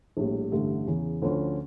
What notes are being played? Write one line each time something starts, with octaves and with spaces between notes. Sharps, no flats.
A#1 A2 G3
A1 G2 D3 A3
E2 C#3 E3
D2 D3 F3 C#4